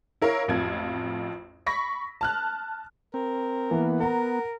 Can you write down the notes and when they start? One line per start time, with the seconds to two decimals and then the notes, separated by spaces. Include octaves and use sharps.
0.22 E4 A#4 C#5 F5
0.48 A1 F2 F4 G#6
1.66 B5 C#6 A#6 B6
2.21 A5 F6 F#6
3.14 C4 A#4
3.71 E3 A#3 B3
4.00 A#4 F#5 A#5